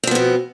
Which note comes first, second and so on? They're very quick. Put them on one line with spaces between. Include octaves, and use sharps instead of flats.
C4 F3 B3 B2